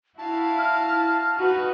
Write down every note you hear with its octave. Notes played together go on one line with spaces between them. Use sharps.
E4 F#4 F5 A5
F6
D#4 F#4 B4